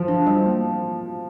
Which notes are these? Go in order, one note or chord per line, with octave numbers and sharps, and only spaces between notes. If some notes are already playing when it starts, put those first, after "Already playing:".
Already playing: F3
D4
G3
A#3